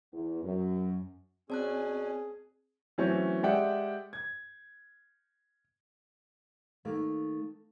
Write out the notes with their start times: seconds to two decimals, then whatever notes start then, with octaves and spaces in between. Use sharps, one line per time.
0.13 E2
0.44 F#2
1.50 B2 C4 C#4 G#4 D5 A5 F#6
2.98 E3 F#3 A3 C4 C#4
3.43 G#3 G4 D5 E5 F#5 G5
4.13 G#6
6.85 D#3 A3 A#3